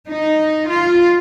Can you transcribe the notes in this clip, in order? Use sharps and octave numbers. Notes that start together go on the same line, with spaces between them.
D#4
F4